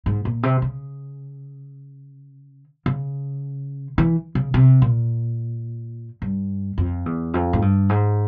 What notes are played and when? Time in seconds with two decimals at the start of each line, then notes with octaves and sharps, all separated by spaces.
0.06 G#2
0.25 A#2
0.43 C3
0.62 C#3
2.86 C#3
3.98 E3
4.35 C#3
4.54 C3
4.82 A#2
6.22 G2
6.78 F2
7.06 E2
7.34 F2
7.53 G#2
7.62 G2
7.89 G#2